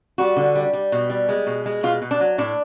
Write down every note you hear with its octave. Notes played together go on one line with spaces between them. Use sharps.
G3 F#4
D3
G3
G3
B2
G3
G#3
B2
G#3
B2 F4
B2
D4
F#3
A2 D4